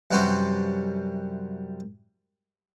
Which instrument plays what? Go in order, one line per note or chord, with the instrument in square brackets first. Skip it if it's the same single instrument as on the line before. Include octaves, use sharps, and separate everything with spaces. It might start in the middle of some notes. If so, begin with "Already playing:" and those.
[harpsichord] F#2 C3 E3 G3 F#4 C5